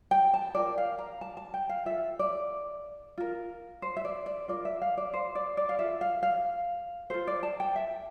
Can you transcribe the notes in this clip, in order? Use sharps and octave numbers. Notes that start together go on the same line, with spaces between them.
G5
A5
F4 A#4 D5
F5
A#5
A5
A5
G5
F5
F4 A4 E5
D5
F4 A#4
C5
E5
D5
D5
F4 A#4 D5
E5
F5
D5
C5
D5
D5
F5
F4 A4 E5
F5
F5
F4 A4 C5
D5
A5
G5
E5